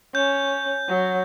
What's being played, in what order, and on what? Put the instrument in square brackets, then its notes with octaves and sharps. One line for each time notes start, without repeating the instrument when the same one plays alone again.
[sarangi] C#4 [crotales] G6
[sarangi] F#3